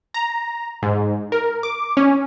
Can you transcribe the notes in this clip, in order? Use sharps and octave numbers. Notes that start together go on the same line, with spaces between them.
A#5
G#2
A#4
D6
C#4